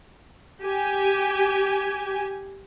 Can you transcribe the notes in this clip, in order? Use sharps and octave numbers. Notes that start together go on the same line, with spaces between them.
G4 G#5